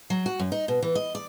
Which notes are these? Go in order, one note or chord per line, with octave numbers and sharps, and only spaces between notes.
F#3
F#4
F#2
D#4
B2
E3
D#5
D5